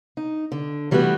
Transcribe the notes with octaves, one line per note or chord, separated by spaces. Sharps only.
D#4
D3
E3 G3 A3 B3 F#4